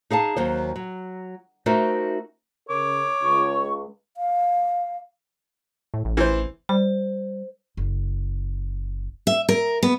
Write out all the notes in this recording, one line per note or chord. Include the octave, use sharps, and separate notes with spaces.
D#4 G#4 F5 A5
D#2 F#3 C5
F#3
A3 D#4 F#4 A#4 C5 E5
C#3 A#4 C#5 D6
C#2 C#6
F5
A2
A1
E3 C5
G3 C5
F#1
E5
A#4
B3